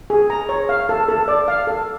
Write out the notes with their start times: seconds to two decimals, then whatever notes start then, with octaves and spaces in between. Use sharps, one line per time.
0.10 G#4
0.30 A#5
0.49 C#5
0.69 F5
0.89 A4
1.08 A4
1.28 D5
1.48 F5
1.67 A4